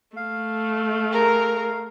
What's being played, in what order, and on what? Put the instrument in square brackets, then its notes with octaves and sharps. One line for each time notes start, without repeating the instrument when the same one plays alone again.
[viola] A3 [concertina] F5
[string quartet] G#4 A#4 A#5